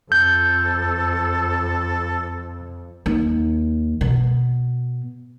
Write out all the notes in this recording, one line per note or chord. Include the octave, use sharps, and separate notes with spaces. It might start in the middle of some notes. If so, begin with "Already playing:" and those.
F2 A4 G6
D#2
B2